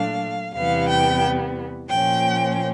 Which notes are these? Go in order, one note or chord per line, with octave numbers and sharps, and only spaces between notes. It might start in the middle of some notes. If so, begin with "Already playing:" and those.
Already playing: A#2 F#3 A3 D4 F5
E2 C3 E3 G3 B3 F5
G5
A#2 F3 A#3 C#4 G5